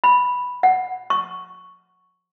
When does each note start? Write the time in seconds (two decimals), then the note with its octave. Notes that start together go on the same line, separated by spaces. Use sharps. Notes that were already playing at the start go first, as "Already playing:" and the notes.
0.04 B5
0.63 F#5
1.10 C#6